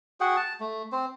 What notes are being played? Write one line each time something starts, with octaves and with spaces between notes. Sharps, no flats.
F#4 G#4 F#5 G5
A5
A3
C4 C5